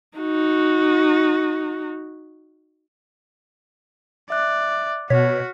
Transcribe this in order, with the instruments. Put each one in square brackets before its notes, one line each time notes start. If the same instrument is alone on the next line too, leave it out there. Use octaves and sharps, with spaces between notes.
[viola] D#4 F#4
[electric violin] D5 [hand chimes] E5 F#6
[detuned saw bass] B2 [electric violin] F#4 [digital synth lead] C#5 [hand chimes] F6 B6